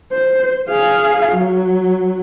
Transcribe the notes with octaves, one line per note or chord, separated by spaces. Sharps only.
C5
G#4 F5
F#3